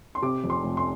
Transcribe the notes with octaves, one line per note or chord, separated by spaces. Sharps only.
C6
C3 D6
F2
C6
F1
C6